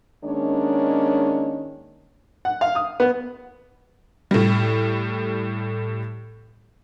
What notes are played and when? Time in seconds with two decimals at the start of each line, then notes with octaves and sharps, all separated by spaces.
0.24 D#3 G#3 A#3 C#4 D4 C#5
2.45 F#5
2.61 F5
2.75 D#6
3.00 B3
4.31 A2 G3